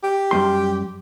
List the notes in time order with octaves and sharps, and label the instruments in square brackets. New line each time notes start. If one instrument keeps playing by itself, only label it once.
[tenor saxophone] G4
[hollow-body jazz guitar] F#2 G3 C6